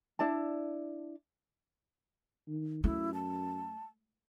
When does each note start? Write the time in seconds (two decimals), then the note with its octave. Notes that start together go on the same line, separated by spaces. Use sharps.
0.19 D4 E4 D5 A5
2.47 D#3
2.84 F#2 A3 E4
3.14 A5